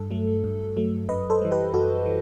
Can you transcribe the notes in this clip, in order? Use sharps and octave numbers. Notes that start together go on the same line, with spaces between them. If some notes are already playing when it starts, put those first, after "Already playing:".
Already playing: G2 A4
F#3 A3
G2
F#3 A3
F#2 B4 D#5
A4 C5
E3 G3
G4 B4
F#2 F#4 A4
E3